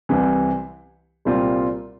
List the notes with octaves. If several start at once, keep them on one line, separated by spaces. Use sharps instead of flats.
C2 C3 E3
C2 A#2 G3 C4 F4